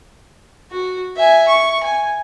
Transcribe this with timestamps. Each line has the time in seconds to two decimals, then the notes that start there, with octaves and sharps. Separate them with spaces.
0.71 F#4
1.16 E5 G#5
1.48 C#6
1.83 G#5